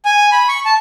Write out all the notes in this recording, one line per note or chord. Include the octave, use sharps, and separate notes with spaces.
G#5
B5
C#6
A5